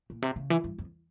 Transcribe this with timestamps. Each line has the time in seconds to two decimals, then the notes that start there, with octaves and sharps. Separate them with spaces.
0.10 A#2
0.22 C3
0.36 C#3
0.50 E3
0.64 G2
0.79 F2